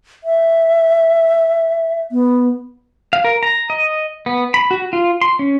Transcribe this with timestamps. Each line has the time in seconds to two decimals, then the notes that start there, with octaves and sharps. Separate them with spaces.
0.24 E5
2.12 B3
3.13 F5
3.24 A#4
3.43 A#5
3.70 D#5
4.26 B3
4.54 B5
4.71 F#4
4.93 F4
5.22 C6
5.39 C#4